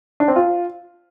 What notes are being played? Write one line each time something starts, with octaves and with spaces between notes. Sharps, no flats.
D4
C4
F4